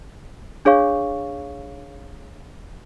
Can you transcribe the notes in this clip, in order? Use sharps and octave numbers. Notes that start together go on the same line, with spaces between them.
D4 G#4 C#5 F5 C#6